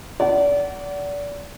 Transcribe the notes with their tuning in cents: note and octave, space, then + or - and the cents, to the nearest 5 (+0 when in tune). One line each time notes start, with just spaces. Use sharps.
D5 -30 F#5 +15